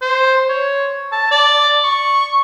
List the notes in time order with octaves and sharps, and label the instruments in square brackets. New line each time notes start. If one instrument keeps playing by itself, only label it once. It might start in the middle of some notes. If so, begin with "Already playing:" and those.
[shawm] C5
C#5
A5
D5
C#6